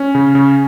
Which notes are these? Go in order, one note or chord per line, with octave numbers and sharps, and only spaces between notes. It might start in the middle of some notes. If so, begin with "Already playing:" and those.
Already playing: C#4
C#3
C#3